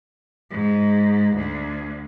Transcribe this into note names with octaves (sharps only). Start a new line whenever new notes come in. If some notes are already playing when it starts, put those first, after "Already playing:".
G#2
D2